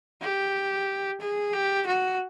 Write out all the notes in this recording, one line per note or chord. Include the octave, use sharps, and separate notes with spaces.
G4
G#4
G4
F#4